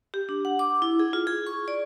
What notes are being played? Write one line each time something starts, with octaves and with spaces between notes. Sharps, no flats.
G4
D4
F#5
D6
E4
G#4
F4
G#4
C#6
D5